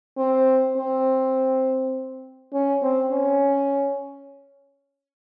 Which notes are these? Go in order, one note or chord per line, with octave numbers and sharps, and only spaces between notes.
C4
C4
C#4
C4
C#4